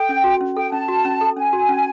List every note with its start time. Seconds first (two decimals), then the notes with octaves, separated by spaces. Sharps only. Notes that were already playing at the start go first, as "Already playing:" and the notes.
Already playing: A4 G5
0.09 C#4
0.24 F#4
0.41 C#4
0.56 A4 G5
0.72 C#4 A5
0.88 F#4
1.05 C#4
1.21 A4
1.37 C#4 G#5
1.53 F#4
1.69 C#4